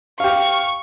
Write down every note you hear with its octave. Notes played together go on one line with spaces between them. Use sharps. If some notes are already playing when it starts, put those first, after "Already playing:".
G4 F5 C#6